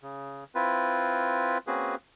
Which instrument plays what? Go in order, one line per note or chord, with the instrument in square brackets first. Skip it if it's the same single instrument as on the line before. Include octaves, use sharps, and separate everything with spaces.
[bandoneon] C#3
C4 E4 F4 B4
A#3 C4 C#4 F#4 G#4 B4